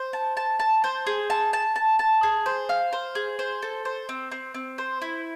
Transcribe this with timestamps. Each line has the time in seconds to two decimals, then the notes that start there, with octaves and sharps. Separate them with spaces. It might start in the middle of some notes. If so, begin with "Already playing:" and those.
Already playing: C5
0.13 A5
0.37 A5
0.60 A5
0.84 C5
1.07 G#4
1.30 A5
1.53 A5
1.76 A5
1.99 A5
2.23 G#4
2.46 C5
2.69 F5
2.93 C5
3.15 G#4
3.39 C5
3.62 A4
3.85 C5
4.09 C4
4.32 C4
4.54 C4
4.78 C5
5.02 E4